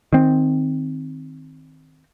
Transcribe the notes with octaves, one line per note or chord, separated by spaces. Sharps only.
D#3 C4